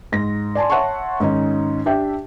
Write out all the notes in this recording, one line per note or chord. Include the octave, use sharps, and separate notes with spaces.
G#2 A#6
D5 G#5 A5 C6
C#5 E5 F#5 A5 C6 C#6
G#2 D#3 C#4 D#4
D4 G4 E5 G5